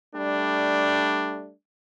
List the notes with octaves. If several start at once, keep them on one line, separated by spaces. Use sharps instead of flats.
G3 A3 D4